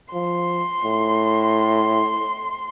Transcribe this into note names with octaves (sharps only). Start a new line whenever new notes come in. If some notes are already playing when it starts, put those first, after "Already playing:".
F3 C6
A2